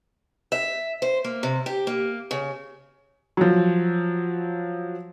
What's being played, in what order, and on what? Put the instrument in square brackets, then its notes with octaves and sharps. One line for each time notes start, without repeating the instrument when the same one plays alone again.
[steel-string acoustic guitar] E5
C5
A#3
C3
G4
A#3
C#3
[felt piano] F3 F#3